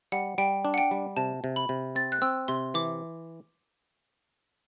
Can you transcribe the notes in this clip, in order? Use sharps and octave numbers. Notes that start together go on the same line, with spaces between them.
G3 F#5
G3 G5
D4
F#5
G5
G3
C3 A5
C3
B5
C3
C4 A6
F#6
C4 E6
C3 C6
E3 D6